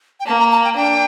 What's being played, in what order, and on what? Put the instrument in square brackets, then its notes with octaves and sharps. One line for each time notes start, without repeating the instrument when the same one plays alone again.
[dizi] G5
[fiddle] A#3 [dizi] A5
[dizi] A#5
A5
G5
[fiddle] D4 [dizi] G5